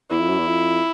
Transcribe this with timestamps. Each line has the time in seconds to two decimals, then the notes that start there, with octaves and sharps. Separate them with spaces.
0.10 E2 E4
0.20 F2
0.29 F#2
0.39 E2
0.48 F2